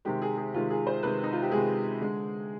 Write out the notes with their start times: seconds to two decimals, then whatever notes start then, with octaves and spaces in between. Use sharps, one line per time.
0.05 C3 D#3 G#3 G4
0.22 G#4
0.37 G#4
0.54 C3 D#3 G#3 F4
0.70 G#4
0.87 C5
1.03 C3 D#3 G#3 B4
1.24 D#4
1.33 F4
1.42 G4
1.52 C3 D#3 G#3 G#4
2.01 D3 G#3